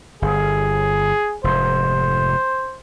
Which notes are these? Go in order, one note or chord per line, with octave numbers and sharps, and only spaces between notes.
G1 G#4
F1 G#2 C5